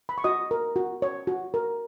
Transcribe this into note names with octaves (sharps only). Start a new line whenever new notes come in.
B5
C#6
F#4 D#5 D#6
A#4
F#4
C#5
F#4
A#4